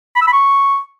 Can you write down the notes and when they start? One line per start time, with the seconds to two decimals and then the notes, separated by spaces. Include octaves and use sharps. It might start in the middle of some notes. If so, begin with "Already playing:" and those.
0.16 B5
0.22 E6
0.27 B5
0.33 C#6